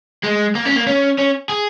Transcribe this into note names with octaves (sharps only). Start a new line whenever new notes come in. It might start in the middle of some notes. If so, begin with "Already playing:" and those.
G#3
A#3
C#4
A#3
C#4
C#4
G#4